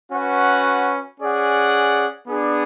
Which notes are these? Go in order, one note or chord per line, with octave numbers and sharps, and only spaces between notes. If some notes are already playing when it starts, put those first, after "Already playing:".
C#4 F#4 B4 F#5
C#4 G#4 D5 F#5
B3 D4 G#4 D5